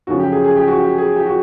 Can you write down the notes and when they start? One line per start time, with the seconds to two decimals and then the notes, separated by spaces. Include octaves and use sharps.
0.07 F#2 C#3 F3 F#4
0.19 G4
0.32 G#4
0.44 G#4
0.56 G4
0.68 F#4
0.80 G4
0.98 G#4
1.16 G4
1.26 F#4